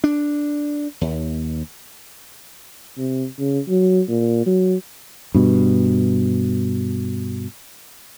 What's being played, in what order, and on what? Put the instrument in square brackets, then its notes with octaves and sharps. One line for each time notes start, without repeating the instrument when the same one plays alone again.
[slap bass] D4
D#2
[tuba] C3
C#3
F#3
A#2
F#3
[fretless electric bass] G2 B2